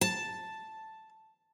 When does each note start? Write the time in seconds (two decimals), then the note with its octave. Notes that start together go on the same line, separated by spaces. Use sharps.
0.01 A5